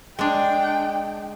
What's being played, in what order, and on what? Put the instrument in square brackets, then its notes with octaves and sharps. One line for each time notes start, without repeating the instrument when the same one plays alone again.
[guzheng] G#3 D4 [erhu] G5